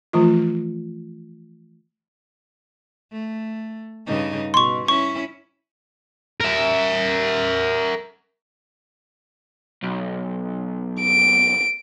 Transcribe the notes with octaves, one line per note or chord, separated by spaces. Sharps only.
E3 F3 A3 F4
A3
G2 C#3 D#4
B2 C6 C#6
C#4 E4 C#6
A#4 E5
B1
D7